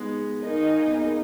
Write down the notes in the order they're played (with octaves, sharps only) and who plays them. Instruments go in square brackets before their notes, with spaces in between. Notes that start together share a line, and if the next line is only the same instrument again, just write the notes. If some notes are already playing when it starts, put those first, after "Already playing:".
Already playing: [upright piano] G#3 B3 D#4
[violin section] A#3 D#4 G#4 D#5
[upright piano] B3